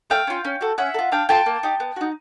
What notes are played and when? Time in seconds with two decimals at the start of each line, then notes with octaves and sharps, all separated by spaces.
0.10 A3 F5 G5
0.27 C#4 F4
0.45 C#4
0.61 F#4 A4
0.78 C#4 E5 F#5
0.94 A4
0.99 F4
1.12 D4 F5 G5
1.29 F4 A4 G5 A5
1.46 A#3
1.63 D#4 G4
1.80 B3
1.96 D#4 F#4